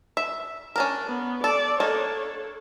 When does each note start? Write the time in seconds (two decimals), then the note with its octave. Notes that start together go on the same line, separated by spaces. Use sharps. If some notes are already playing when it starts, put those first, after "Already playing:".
0.17 E5
0.76 C#4 D4 A#4
1.08 B3
1.44 A4 D5
1.80 A#3 D4 A4 C#5 D#5